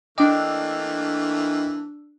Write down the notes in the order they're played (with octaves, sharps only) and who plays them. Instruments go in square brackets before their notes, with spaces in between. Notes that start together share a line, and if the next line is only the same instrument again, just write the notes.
[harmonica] E3 A3 A#3 [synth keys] D4 E6 [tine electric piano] D#5 G5 D6